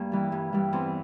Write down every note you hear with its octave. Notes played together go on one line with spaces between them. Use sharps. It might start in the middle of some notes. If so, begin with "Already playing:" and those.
Already playing: G2 A#3
E3 G3
G2
E3 G3
E2 C4